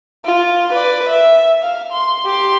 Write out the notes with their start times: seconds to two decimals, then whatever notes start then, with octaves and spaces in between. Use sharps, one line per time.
0.25 F4
0.73 B4 D5
1.08 E5
1.62 F5
1.92 C6
2.25 G4 C6